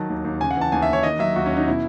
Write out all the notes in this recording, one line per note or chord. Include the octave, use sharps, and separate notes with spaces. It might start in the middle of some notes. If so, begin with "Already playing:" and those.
Already playing: D#3 F#3 A5
D#2
D#2
C#3 G#5
F#5
E3 A5
D#2 G#5
E5
D#2 C#5
D#3 D#5
F#3 E5
D#2 F#4
C#4
D#2 D#4
B2 E4